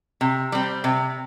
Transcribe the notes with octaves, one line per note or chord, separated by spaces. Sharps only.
C3
G3 C4
C3